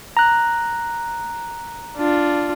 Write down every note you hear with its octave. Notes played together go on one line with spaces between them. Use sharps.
A#5 F#6
D4 F4